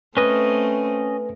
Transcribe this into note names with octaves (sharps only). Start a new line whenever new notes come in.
A3 C4 C#4 B4 D#5 G#5